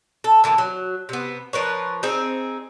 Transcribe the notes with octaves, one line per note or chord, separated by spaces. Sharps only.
A4
D3 E3 A#3 B3
F#3
C3 B3
F3 A#4 B4 C#5
C4 D#4 G#4